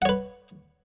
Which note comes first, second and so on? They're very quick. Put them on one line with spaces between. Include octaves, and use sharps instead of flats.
F#5 C#5 B4